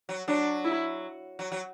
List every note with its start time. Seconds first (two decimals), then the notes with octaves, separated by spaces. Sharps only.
0.09 F#3
0.28 F#3 D4
0.65 E4
1.39 F#3
1.52 F#3